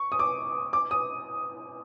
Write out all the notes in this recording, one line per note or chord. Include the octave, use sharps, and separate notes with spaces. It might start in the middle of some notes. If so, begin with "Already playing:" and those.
Already playing: C#6
D#6
D6
D6
D#6